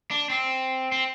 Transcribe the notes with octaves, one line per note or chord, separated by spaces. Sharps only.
D4
C4
C4